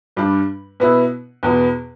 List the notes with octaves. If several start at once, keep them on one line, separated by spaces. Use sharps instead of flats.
G2 G3 D4
B2 B3 E4
E2 B2 B3